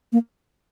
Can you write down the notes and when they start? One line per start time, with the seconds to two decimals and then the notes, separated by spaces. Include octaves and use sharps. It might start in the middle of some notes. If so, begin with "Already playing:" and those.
0.12 A#3